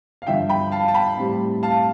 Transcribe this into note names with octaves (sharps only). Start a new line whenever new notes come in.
F5
G2 D3 F3 E5 G5
G5 B5
F5 A5
A5
G5 B5
A2 G3 C4
F5 A5